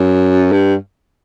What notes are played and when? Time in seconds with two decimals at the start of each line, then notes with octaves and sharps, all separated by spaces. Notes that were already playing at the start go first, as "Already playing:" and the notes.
Already playing: F#2
0.52 G2